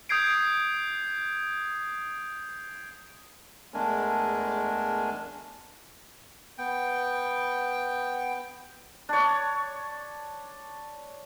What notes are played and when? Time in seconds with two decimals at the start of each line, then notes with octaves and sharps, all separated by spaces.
0.09 D#6 G6 G#6 C7 D7
3.74 E2 G#3 A3 D4 A#4 G#5
6.58 B3 G5
9.09 D4 C#5